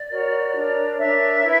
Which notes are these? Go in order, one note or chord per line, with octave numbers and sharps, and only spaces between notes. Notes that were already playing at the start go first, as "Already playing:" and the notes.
Already playing: D5
F#4 A#4 C#5
D4 A#4 C#5
D4 A#4 C#5 E5
E4 B4